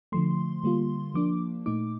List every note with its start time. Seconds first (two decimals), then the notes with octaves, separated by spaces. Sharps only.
0.12 D3 F3 A3 C6
0.64 D3 G3 A#3 F4
1.14 F3 A#3 D4 D6
1.66 A#2 A3 D#4 D6